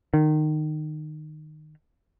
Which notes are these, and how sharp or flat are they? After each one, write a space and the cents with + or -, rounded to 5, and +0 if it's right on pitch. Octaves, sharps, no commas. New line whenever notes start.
D#3 -20